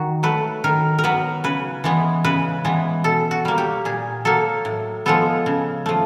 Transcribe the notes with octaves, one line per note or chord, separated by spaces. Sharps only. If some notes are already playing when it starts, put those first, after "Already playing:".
Already playing: D#3 F#4
F#3 A3 B4
D#3 A#4
A#4
F#3 B3 B4
C#3 B4
E3 G#3 B3
C#3 B4
E3 G#3 B3
B2 A4
F#4
G3 A#3
G4
A#2 G#4
F#3 A#3 A4
A2
F3 G#3 B3 A4
C#3
F3 A3